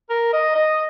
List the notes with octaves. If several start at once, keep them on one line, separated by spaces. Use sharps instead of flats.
A#4
D#5
D#5